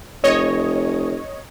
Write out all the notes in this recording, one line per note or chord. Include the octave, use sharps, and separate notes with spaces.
F1 C#5 D#5